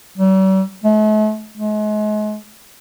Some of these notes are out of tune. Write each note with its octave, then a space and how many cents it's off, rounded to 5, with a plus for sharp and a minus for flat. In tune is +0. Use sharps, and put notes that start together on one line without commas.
G3 -45
A3 -45
G#3 +40